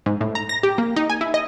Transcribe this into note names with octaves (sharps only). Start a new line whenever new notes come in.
G#2
A2
A#5
A#6
G4
A#3
D#4
G#5
E4
D#5